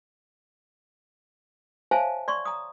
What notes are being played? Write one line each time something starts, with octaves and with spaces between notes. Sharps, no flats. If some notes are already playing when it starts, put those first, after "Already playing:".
C5 C#5 E5 F5 G#5 A5
D5 C6 C#6
A#5 D#6